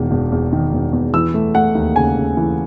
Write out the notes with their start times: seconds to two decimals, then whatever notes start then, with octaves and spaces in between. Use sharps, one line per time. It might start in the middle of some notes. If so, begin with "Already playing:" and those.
Already playing: E1 E2 D#3
0.11 E1
0.32 E2
0.53 D#3
0.73 E1
0.93 E2
1.14 E3 E6
1.34 A3
1.55 A3 F#5
1.75 D#2
1.96 C#3 G#5
2.17 C#3
2.37 E3